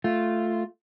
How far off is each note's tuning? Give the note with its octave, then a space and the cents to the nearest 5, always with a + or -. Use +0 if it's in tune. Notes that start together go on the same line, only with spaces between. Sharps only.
A3 +0 F4 +0